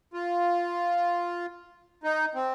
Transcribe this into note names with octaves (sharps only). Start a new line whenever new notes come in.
F4
D#4
C4